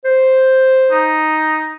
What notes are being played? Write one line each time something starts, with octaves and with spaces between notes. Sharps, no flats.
C5
D#4